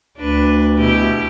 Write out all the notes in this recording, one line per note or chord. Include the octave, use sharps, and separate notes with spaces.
D2 D4 B4
B2 E4 G4